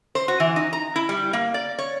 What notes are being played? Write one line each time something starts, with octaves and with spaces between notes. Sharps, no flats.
C5
F#4
E3
D#4
A#5
E4
G3
A#3
D5
C#5